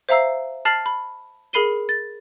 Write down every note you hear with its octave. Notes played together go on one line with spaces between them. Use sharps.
C5 E5 F5 A#5 E6 C7
A5 F6 A6 C7 F#7
B5
G#4 A#4 B5 C7 D#7 G7
A6